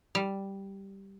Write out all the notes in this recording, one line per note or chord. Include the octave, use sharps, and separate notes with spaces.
G3